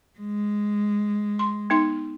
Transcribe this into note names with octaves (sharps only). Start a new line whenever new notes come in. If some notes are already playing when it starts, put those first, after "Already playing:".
G#3
C6
B3 D#4 C6